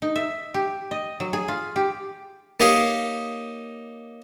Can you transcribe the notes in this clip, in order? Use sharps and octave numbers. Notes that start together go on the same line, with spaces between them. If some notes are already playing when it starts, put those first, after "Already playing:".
D#4
E5
G4
D#5
F#3
G#4
F4
G4
A#3 D#4 G4 C#5 D#5 F5